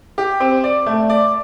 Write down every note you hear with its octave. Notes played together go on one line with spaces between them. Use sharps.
G4
C4
D5
A3
D5